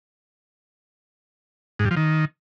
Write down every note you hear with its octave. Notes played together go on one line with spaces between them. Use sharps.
G#2
G2
F3
D#3